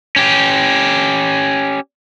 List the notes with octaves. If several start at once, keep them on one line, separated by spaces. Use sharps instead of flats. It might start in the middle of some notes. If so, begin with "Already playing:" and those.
C#4 G4